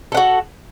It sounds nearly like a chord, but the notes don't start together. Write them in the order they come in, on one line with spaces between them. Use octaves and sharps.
A4 F#5 F#4